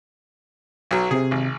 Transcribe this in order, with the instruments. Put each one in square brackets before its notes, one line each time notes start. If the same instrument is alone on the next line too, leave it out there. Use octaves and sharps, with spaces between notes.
[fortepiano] B1 F#3
[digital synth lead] C3 [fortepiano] G#4
[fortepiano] G#1